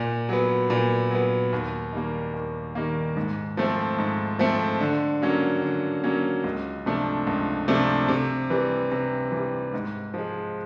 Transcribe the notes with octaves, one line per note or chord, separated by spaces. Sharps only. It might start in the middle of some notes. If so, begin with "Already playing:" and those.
Already playing: A#2
F#3 B3
A#2
F#3 B3
D#2
D#3 G3 A#3
D#2
D#3 G3 A#3
G#2
F3 A3 C4
G#2
F3 A3 C4
D3
F#3 A#3 C#4
D3
F#3 A#3 C#4
C#2
C3 F3 A3 D4
C#2
C3 F3 A3 D4
C3
E3 G3
C3
E3
G3
G#2
F3 G#3